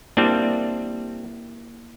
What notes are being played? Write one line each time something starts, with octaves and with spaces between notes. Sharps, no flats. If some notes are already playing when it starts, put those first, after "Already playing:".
G3 A#3 C4 D4 E4